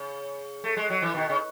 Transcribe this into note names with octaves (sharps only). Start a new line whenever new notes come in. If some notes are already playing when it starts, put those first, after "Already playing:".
Already playing: C#3
A3
G#3
F#3
E3
B2 D#3
C#3